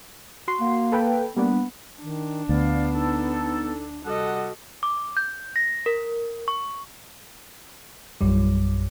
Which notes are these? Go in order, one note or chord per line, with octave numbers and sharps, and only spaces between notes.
F#4 C6
A#3
A4 B4 G5
G3 A#3 B3 D4
D#3 D4
D2 B3 D5 F5
D#4 A4
C3 G3 F#4 A4 D#5 F#5
D6
G6
A#6
A#4
C#6
A#1 F#2 G3